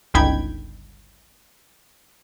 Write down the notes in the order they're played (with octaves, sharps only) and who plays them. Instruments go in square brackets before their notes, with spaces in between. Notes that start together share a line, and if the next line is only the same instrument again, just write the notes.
[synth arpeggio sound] G1 C#2 D#4 G5 B5 G#6